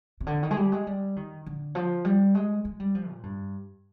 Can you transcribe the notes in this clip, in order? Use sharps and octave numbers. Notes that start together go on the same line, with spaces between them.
C3
D3
D#3
G#3
G3
G#3
G3
D#3
D3
F3
G3
G#3
G#3
G3
F3
A#2
G2